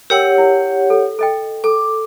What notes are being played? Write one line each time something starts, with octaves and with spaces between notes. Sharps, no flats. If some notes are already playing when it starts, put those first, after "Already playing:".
G4 A#4 C#5 F#5 G5 E6
E4
A4
A4 D#5 G5
A4 D6